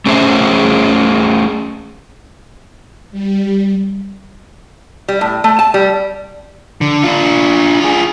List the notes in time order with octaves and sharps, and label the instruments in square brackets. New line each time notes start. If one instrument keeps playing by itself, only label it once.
[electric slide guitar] A3 C#4 G#4 C5 E5
[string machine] G3
[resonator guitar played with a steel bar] G3
A2
A3
A5
G3
[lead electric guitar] D3
D4 F4
F4 G#4